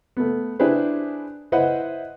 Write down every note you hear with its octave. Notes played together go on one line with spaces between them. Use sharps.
A3 B3
D4 E4 G4 G#4 B4 C5
E4 B4 C5 D#5 E5 F#5